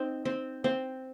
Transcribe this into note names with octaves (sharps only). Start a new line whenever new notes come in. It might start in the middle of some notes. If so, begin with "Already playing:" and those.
Already playing: C4 D#4
C4
C4